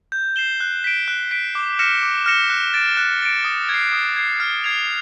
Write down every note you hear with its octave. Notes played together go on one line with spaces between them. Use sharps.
G6
C7 E7 G7
F#6
B6 D7
F#6
B6 D7
D6
F6 A#6 C#7 E7
D6
F6 A#6 C#7 E7
F#6
A6 D7
F#6
A6 D7
D#6
G#6 C7
D#6
G#6 C7
F6
G#6 C7 F7